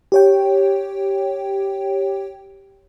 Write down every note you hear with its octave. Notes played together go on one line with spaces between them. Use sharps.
G4 C#5 G5